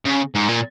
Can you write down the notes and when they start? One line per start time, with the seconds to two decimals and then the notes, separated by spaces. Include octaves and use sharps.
0.06 C#3
0.35 G#2
0.49 A#2